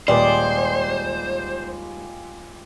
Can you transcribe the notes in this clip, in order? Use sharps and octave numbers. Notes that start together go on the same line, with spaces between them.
D#1 G#3 F4 G4 B4 C5 D5